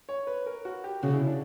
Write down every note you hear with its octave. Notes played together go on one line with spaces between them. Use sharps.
C#5
B4
A#4
F#4
G4
C#3 F#4
E4
D4